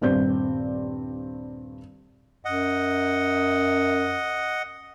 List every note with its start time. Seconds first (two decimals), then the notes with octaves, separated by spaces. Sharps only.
0.01 D#1 G2 C4 D5 G6
2.45 F#2 D#5 F#5